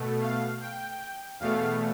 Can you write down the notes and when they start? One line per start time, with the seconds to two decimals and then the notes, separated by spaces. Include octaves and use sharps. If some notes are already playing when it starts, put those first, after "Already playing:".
Already playing: B2 A3
0.21 F5
0.60 G5
1.40 E2 B2 A3 F5